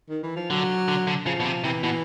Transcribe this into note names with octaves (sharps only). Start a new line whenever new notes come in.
D#3
E3
F3
D3 F#3
D3
D3
C#3 F3
B2
C3
C3 E3
B2 E3